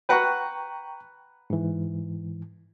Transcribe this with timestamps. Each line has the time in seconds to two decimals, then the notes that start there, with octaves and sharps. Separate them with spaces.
0.09 B4 F#5 G5 A#5 C#6
1.50 G#2 E3